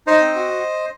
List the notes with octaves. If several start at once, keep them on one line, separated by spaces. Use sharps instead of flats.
D#4 C5 D#5
C4
F#4